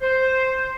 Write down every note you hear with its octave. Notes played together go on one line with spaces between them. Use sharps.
C5